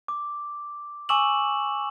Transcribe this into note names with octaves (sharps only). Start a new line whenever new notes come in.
D6
G#5 C#6 D6 E6 E7 F#7